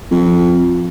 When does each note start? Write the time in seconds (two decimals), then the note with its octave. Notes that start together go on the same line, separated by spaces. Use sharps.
0.11 F2